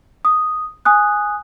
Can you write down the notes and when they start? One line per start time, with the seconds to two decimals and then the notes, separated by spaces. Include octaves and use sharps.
0.25 D#6
0.85 G#5 D#6 F#6